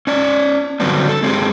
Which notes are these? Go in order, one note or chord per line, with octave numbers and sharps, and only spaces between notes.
C#4 D5
D3 F#3 G3 B3 C4 D4
A4
G#3 C4 G4 G#4